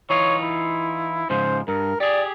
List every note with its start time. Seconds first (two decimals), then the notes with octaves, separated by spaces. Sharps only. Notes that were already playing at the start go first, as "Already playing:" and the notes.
0.10 E3 D#4 F4 C#5
0.42 E4
1.30 G#2 C#3 F3 C5
1.68 G2 A#4
2.00 G4 G#4 D5